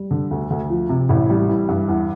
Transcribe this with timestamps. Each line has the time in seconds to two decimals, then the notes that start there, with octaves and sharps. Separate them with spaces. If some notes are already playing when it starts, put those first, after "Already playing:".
Already playing: G3
0.11 D3
0.31 D2
0.50 D2
0.70 F3
0.89 C3
1.09 A1 E4
1.30 G3
1.49 E3
1.69 G2
1.88 E2